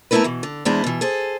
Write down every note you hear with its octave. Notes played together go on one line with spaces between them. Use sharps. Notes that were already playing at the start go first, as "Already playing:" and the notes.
A3 B3 C4 E4 A#4 B4
B2 E3
D3
E2 G#3 D4 E4 C5
B2 E3
G#4 A4 C5